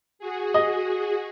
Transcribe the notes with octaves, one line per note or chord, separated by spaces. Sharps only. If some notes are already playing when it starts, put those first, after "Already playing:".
F#4 G#4
D#5